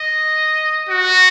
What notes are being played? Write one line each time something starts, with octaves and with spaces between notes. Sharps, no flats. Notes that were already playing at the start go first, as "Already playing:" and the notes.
Already playing: D#5
F#4